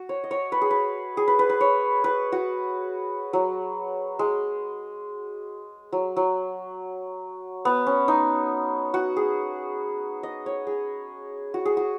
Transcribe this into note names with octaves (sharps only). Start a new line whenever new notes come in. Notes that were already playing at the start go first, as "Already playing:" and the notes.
Already playing: F#4
C#5
D#5
C#5
B4
G#4
B4
G#4
B4
B4
B4
C#5
B4
F#4
F#3
G#3
F#3
F#3
B3
C#4
D#4
F#4
G#4
D#5
C#5
G#4
F#4
G#4
F#4